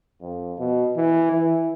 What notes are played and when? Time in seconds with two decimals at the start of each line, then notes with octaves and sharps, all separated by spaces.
0.21 F2
0.59 B2
0.97 E3
1.33 E3